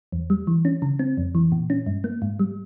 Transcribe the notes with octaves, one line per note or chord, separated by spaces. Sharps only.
E2
G3
E3
C#4
C#3
C4
F2
E3
A#2
C#4
G2
A#3
G#2
G3